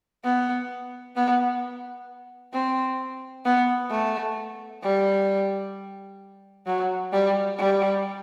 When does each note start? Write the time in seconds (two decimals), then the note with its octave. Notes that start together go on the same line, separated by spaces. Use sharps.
0.24 B3
1.16 B3
2.53 C4
3.45 B3
3.90 A3
4.83 G3
6.66 F#3
7.12 G3
7.58 G3